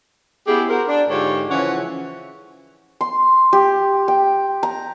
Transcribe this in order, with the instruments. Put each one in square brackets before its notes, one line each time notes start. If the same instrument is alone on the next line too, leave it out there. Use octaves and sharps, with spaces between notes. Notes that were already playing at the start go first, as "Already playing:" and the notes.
[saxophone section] B3 C#4 E4 G4 G#4
F#4 A#4 C5
D4
G#2 D3 F4 G4 A4 C#5
C#3 E3 F3 C#4 F#5
[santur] C6
G4
G5
A#5